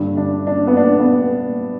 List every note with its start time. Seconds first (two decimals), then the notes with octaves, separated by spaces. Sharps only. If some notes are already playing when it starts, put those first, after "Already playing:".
Already playing: G2 D3
0.17 D4
0.47 D4
0.67 B3
0.77 D4
1.00 B3